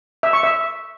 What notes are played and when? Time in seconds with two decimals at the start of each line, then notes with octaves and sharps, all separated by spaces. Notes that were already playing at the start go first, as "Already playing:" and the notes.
0.23 E5
0.33 C#6
0.43 E5